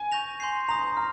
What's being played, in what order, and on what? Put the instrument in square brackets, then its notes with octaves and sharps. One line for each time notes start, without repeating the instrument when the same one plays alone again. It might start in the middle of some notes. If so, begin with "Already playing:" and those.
Already playing: [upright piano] G#5
[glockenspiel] C#6 G6 A#6 F7
C6 G6 C7
[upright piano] A#5 [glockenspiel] D#6 A#6 F7
[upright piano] A#5 [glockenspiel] F6